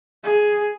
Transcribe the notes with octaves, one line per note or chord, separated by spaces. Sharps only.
G#4